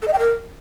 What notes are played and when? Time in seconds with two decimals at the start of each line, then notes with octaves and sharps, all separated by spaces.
0.02 A4
0.07 D#5
0.13 G5
0.18 A#4